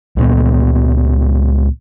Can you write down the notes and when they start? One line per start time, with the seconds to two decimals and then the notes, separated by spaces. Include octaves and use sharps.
0.17 C#2 A#2 B3